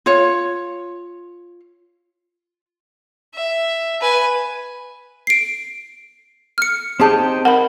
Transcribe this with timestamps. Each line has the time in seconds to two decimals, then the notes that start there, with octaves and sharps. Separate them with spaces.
0.06 F4 C#5
3.35 E5
4.01 B4 G#5
5.27 C7 D7
6.58 F6 C#7
7.00 C4 D#4 G4 G#4 G5 A5
7.45 A#4 F#5 B5